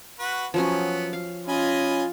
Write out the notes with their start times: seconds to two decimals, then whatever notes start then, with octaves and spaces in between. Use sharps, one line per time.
0.19 F#4 B4
0.54 F3 F#3 B3 C#4
1.13 F5
1.48 C#4 F4 D#5 G#5 B5